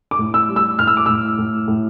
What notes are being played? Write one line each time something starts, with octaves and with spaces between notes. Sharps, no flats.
D6
A2
E6
G3
E6
A2 F6
E6
D6
A2 E6
A2
A2